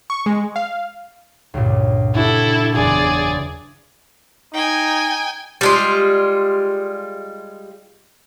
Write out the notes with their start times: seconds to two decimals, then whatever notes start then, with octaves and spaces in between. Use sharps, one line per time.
0.10 C#6
0.26 G#3
0.56 F5
1.54 C#2 G2 A#2
2.15 D4 E4 F#4 G4 A4
2.75 F#1 E2 G#4 D5
4.54 D#4 G5 G#5
5.61 G3 G#3 F4